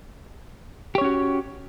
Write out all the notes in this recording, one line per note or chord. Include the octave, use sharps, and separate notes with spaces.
C#4 F#4 G4 C#5